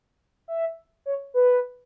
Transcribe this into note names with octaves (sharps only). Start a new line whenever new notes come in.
E5
C#5
B4